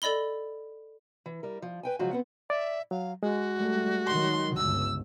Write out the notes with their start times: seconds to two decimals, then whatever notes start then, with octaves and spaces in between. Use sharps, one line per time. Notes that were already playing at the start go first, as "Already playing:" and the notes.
0.02 A4 D5 D#5 B5 G7
1.26 E3
1.43 G3 A#4
1.62 F3
1.83 B4 G5 G#5
1.99 C#3 F3 F#3 G#3 F4 F#4
2.11 B3 C4 F#5
2.50 D5 E5
2.91 F#3 F5
3.23 G#3 F#4
3.58 G3 A3
4.07 D#3 F#3 C6
4.57 G1 C#2 E6